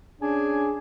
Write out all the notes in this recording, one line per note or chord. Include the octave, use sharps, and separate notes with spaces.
C#4 D4 G#4 G#5